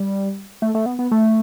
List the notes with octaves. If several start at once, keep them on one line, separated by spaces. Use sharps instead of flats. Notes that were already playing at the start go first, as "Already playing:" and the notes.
Already playing: G3
A3
A3
B3
B3
A3